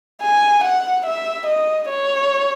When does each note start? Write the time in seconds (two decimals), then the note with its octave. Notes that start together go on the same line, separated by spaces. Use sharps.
0.23 G#5
0.64 F#5
1.06 E5
1.47 D#5
1.89 C#5